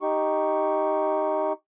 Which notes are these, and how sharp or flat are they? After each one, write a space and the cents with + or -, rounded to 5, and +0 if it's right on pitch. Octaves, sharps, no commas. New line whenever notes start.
D#4 +0 G4 +0 C#6 +0